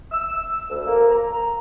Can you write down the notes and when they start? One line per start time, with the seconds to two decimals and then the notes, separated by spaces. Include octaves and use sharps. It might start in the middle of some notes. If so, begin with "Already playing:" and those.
0.11 E6
0.69 D2
0.86 A#3
1.10 A#5
1.31 A#5